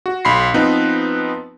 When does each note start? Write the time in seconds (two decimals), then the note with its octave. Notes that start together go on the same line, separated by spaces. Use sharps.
0.06 F#4
0.25 B1 B5 C6 C7
0.54 F3 B3 C4 D#4 B4